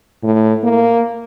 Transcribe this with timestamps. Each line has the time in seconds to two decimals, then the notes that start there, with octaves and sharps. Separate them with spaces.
0.23 A2
0.63 A#3